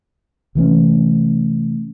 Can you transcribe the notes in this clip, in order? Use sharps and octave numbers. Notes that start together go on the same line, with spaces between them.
C3 E3 A3 C#4